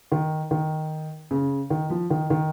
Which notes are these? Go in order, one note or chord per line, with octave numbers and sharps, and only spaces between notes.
D#3
D#3
C#3
D#3
F3
D#3
D#3